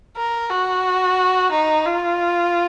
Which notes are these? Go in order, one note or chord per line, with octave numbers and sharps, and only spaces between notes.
A#4
F#4
D#4
F4